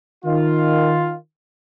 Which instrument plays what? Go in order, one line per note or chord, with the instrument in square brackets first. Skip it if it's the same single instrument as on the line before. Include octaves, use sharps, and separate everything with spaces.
[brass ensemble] D#3 F4